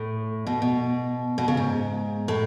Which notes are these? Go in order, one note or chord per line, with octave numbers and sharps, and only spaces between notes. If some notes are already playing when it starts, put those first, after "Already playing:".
Already playing: A2
B2
B2
B2
C#3
G#2
A2